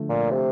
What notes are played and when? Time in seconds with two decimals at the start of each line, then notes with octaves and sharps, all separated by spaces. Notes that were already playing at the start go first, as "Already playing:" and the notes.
Already playing: D3 F3 A3
0.09 A#2
0.31 C3